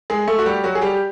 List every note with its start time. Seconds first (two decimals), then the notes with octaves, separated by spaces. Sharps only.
0.10 G#3 G#4
0.28 A3 A4
0.39 F#4
0.46 G3 G4
0.64 F#3 F#4
0.75 G#4
0.82 G3 G4